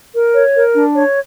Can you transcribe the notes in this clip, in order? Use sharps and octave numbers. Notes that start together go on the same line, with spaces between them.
A#4
C#5
A#4
D4
C#5